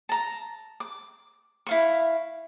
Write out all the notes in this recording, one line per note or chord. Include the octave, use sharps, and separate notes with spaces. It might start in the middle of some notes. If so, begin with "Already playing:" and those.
A5 A#5
D6
E4 F5 C#6